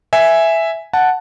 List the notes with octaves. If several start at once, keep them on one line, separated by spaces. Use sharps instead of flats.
E5 G#5
F#5 A5